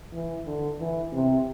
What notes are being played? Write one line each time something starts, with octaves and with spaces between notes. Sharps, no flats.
E3
D3
E3
C3